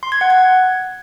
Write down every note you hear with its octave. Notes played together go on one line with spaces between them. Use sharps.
C6
G#6
F#5
G#6